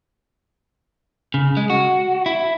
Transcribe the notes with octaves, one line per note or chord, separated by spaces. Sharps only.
C#3
G#3
F#4
E4